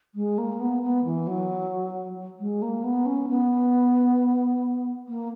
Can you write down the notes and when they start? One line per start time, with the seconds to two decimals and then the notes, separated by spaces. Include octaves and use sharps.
0.15 G#3
0.38 A#3
0.60 B3
0.83 B3
1.05 E3
1.27 F#3
2.40 G#3
2.62 A#3
2.84 B3
3.06 C#4
3.28 B3
5.08 A#3